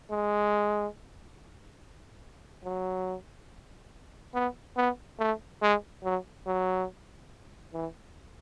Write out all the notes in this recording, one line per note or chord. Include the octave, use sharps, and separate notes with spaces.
G#3
F#3
B3
B3
A3
G#3
F#3
F#3
E3